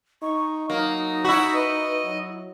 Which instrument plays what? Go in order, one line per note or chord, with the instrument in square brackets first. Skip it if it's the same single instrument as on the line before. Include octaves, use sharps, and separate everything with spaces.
[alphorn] D#4 [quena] C#6
[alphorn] F#3 [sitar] A#3 [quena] D#4
[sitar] E4 F#4 [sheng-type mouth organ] B5
[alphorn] B4 [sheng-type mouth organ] D#5
[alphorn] F#3